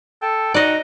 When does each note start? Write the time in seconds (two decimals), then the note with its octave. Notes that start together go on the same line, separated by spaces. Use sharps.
0.22 A4 G5
0.54 D#4 F#4 D5 D#5